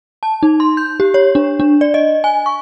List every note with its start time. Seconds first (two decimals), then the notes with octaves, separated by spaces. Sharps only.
0.23 A5
0.43 D#4
0.60 C6
0.77 G6
1.00 G4
1.14 C#5
1.35 D4
1.60 D4
1.81 D5
1.94 D#5
2.24 G#5
2.46 C#6